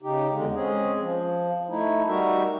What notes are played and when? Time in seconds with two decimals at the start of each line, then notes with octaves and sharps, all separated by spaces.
0.02 C#3 D#4 G4
0.31 E2 D3 G#3
0.54 G#3 C4 C#4 G#4
0.98 F3
1.69 A3 D#4 E4
2.07 G3 D#4 F#4 A#4 E5